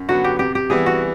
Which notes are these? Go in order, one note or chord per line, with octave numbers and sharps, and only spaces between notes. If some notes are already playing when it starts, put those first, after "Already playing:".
Already playing: F#2
D3 F#3 B3 F#4
G4
C3 G4
G4
E3 G3 B3 E4 G#4
F#4